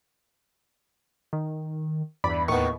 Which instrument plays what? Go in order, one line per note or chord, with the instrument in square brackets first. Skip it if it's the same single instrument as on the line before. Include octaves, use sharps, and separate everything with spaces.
[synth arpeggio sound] D#3
[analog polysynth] E2 [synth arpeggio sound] G2 D5 B5
[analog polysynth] D#2 A2 [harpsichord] D#3 B3 [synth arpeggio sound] C#6